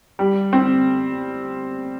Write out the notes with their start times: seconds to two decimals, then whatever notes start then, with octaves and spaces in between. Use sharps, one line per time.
0.19 G3
0.53 C4